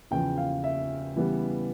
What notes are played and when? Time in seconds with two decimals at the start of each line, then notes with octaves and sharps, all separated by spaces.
0.11 E2 C#3 F3 G5
0.38 F5
0.64 E5
1.16 C#3 E3 G3 B3